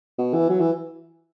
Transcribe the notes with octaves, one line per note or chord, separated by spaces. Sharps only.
B2
E3
F#3
E3